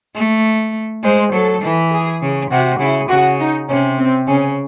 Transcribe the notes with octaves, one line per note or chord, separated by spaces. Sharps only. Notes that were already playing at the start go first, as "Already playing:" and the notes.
A3
G#3 C5
F#3 A4
E3
G#4
C#3
C3 F#4
C#3 E4
C#3 F#4
D#4
C3 C#4
C4
C#3 C#4